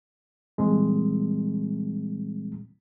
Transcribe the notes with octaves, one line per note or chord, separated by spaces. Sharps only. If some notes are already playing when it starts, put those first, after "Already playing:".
A#2 E3 G3 G#3 C4